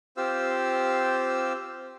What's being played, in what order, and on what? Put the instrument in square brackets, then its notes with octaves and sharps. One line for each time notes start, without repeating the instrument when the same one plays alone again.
[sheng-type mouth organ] C4 F4 G4 C5 F5 E6